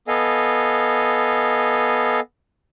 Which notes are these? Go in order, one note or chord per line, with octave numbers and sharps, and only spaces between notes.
B3 A4 D#5 F5 G#5